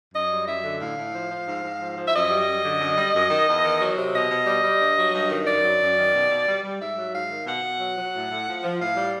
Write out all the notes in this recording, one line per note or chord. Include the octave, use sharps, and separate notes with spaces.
F#2 D#5
G3
F#2 E5
D3
A2 F5
A2
F3
F3
G#2
G#2
F3
F3
E5
F#2 D#5
G3
F#2
D3
F#2
G3
F#2
D#3
E2
D#3
F#3
C3
B2 D#5
B2
G3
G3
G2
F#3
G2
D#3
F#2 D5
F#3
F#2
D#3
B2
B2
G3
G3
G#2 E5
F#3
G#2 F5
D#3
B2 F#5
B2
F#3
F#3
A2
A2
F3
F3
A2 F5
G3